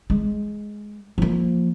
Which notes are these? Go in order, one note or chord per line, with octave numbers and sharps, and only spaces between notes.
G#3
F3 A#3